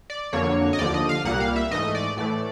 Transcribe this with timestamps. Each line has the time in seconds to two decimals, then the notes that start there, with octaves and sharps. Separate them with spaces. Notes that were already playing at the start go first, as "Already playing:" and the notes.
0.10 D5
0.33 F2 D3 F#3 A#3 C#5
0.73 D#5
0.79 D#2 D3 F3 D5
0.94 D#5
1.09 F5
1.24 C2 A#2 G3 A#3 F#5
1.40 F5
1.56 E5
1.70 G#2 E3 A3 D#5
1.95 D5
2.17 A2 E3 A3 D5